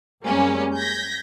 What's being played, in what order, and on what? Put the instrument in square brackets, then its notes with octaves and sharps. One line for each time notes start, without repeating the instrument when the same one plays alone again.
[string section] F#2 G3 G#3 A#3 C4 C#4
G6 G#6 A#6 B6